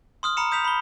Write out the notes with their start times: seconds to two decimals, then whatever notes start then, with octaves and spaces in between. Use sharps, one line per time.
0.23 C6 D#6 F6
0.37 A#5 B5 C#7 E7
0.51 D#6 G6 B6 F7
0.65 B5 G7